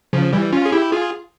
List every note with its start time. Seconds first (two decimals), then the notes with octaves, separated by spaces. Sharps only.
0.13 C#3 F3
0.33 E3 G3
0.52 C#4 F4
0.66 G#4
0.72 E4 G4
0.92 F4 G#4